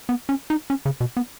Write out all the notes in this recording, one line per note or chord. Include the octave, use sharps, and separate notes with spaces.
B3
C#4
D#4
C#4
C#3
B2
B3